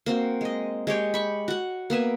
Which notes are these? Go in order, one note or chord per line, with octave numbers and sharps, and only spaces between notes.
A#3 C4 F#4
G#3 D#5
G#3 G4 C#5 G5
B5 C#6
F#4 F#5
A#3 B3 E5 G#5